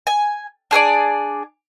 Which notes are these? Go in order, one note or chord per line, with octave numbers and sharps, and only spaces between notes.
G#5
D4 G#4 A4 D5